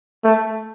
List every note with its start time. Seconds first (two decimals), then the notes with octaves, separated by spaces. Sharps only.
0.24 A3